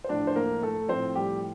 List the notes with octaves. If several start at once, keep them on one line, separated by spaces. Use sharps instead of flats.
C5
A2 F3 D4 D5
C5
A#3 A#4
A3 A4
A2 F3 C4 C5
G3 G4